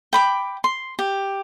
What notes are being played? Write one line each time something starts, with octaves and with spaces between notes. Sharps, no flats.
G5 B5 D6
C6
G4